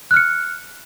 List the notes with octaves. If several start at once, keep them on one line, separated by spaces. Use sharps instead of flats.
F6 F#6 C#7